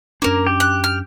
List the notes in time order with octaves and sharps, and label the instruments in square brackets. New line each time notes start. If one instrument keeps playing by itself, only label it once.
[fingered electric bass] F#2 C#4 D4 [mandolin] A#3 A#4
[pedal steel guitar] G4
[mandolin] F#6
F6